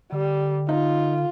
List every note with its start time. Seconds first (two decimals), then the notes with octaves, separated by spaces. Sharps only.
0.12 D3 G3
0.69 D#4 F4